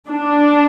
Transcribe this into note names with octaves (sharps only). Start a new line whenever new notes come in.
D4